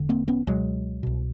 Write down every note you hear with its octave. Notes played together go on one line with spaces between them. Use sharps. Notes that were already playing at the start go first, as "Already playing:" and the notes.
Already playing: E1 D3
A#3 C4
B3 C#4
C#2 B2 F#3 G#3
C2 B2